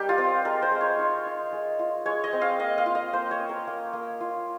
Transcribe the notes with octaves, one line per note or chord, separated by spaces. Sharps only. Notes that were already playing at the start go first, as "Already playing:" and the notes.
Already playing: G3 D#4 G4 A#4
F4
C4
G#3 A#4
C5
G#3
C#5
D#4
D#4
G#3
F4
G#3 C#5
D#5
C4
F5
A#3 D#5
F5
F4
D#5
A#3 C5
C#5
C#4
A#4
A#3
A#3
F4